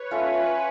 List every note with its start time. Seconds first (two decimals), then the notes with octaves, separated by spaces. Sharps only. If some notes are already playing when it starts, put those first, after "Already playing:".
Already playing: B4 C#5
0.11 A3 C#4 F4